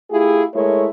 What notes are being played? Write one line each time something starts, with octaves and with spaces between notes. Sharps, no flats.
A3 E4 F4 G4 G#4
G#3 A3 E4 A#4 C#5